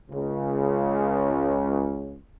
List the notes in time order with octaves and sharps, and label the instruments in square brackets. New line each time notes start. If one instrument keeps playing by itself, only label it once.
[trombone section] C#2 C#3